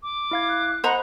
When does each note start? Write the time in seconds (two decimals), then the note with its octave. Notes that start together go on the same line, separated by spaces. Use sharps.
0.03 D6
0.31 E4 F5 G#6
0.47 F#6
0.84 C5 D#5 F#5 A#5 B5